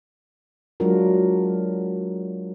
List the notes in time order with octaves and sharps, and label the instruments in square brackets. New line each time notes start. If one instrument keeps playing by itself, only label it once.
[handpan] F#3 G#3 D4 F4 F#4 A#4